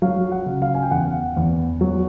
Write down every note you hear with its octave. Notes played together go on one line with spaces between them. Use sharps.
F#3 F5
F#5
C#3
F5
G#5
G5
E2 F#5
E2
F#3